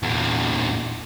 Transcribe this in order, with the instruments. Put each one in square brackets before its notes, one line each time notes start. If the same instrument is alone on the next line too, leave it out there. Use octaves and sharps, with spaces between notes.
[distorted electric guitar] E2 A#2